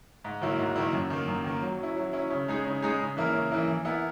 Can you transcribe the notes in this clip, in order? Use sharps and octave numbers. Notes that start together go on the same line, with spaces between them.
G#2
D#3 F#3 A#3 E4
G#2
D#3 F#3 A#3 E4
F#2
D#3 A#3
F#2
D#3 A#3
F#3
C#4 E4
F#3
C#4 E4
C#3
G#3 D#4 G#4
C#3
G#3 D#4 G#4
C#3
E3 A#3 E4 A#4
C#3
E3 A#3 E4 A#4
E3
B3 E4 A#4